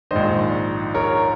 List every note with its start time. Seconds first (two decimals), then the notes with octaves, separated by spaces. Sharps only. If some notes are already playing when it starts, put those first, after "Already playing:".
0.11 A#1 G#2 D#3 C5 D#5
0.94 A#4 C#5